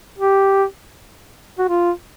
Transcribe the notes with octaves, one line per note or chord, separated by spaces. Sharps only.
G4
F#4
F4